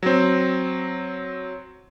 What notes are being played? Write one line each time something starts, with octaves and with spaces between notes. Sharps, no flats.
F#3 C4